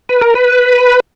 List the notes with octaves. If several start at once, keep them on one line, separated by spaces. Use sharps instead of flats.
B4
A#4
B4